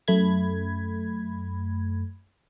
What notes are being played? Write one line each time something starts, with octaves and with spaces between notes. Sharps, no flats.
F#2 A3 B5 G#6